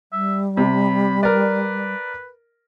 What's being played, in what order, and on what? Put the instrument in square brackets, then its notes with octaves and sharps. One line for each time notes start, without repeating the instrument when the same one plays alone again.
[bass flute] G3 [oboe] E5
[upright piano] C3 [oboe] B5
[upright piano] A#4 D5 [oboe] B4